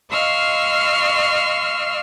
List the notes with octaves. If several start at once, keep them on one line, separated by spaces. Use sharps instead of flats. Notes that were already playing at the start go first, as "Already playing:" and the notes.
D#5 F5 C6 C#6 E6 F6